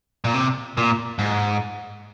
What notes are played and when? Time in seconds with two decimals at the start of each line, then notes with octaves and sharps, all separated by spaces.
0.25 A#2
0.34 C3
0.77 A#2
1.19 G#2